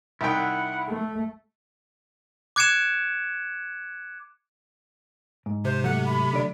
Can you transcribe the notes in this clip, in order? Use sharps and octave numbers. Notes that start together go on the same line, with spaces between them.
C2 D#3 E4 F#5 G5
A3
D6 F#6 G#6 C#7 D7 E7
G#2
C3 C5
F#3 A3 F#5
B5
D3 D5